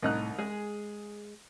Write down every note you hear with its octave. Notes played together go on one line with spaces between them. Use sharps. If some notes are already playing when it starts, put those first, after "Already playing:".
C2 A2 D#4 F#6
G#3 G#4